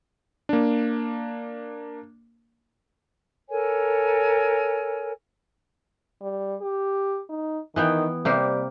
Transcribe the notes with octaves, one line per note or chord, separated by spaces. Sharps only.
A#3 D4
A4 A#4 C#5 G#5
G3
G4
D#4
D#3 E3 B3 G5
C3 G3 A#3 G4